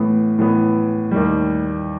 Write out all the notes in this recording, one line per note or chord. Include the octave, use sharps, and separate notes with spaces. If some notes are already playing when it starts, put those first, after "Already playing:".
Already playing: A2 E3 A3 B3
A2 E3 B3
D#2 D#3 G3